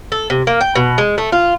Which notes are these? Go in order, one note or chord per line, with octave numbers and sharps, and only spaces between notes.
A4
C3
A#3
G5
B2
G#3
A3
F4